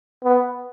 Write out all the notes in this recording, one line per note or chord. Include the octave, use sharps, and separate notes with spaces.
B3